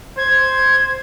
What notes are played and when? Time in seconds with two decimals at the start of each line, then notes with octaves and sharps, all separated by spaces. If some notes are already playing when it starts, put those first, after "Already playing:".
0.17 C5 G#6